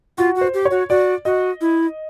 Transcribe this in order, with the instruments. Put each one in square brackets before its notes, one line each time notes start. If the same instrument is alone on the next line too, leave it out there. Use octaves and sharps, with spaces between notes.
[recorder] F4 [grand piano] F#4
[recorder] F#4
[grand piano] C5
[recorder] G4
[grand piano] C#5
[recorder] F#4
[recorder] F#4 [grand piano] D5
[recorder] F#4 [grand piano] D#5
[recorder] E4